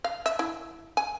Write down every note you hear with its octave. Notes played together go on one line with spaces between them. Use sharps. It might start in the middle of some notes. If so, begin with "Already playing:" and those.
F5
E5
E4
G#5